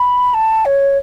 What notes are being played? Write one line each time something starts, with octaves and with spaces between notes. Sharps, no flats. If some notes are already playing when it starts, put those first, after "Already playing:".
Already playing: B5
A5
C#5